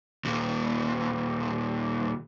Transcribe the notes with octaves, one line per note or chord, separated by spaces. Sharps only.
D#2 A#2